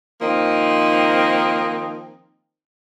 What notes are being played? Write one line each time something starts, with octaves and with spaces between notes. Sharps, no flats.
D#3 F3 A#3 C4 D#4